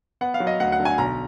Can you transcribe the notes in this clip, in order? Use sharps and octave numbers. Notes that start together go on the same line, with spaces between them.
B3 F#5
F5
F#3
D#5
D2 F#5
F#5
D3
G#5
B1 A#5